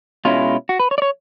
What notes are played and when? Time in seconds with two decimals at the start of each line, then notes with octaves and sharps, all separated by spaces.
0.25 B2 G#3 C#4 E4 F4
0.69 F#4
0.79 B4
0.91 C#5
0.98 D5
1.02 C#5